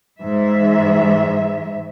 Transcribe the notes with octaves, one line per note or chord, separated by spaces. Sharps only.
G#2 E3 E5